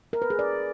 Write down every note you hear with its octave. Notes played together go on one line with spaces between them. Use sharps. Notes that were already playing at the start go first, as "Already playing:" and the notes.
A#4
B4
G#4
D5